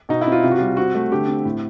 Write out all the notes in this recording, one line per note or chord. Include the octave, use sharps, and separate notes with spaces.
B2 D#4
E4
C4
F4
C3 F4
F#4
G3 F4
C4 F#4
A3
D3 G4
C4
A2